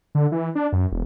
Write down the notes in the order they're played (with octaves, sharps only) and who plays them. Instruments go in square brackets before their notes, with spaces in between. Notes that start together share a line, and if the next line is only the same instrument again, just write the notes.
[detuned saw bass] D3
E3
D4
F#2
E1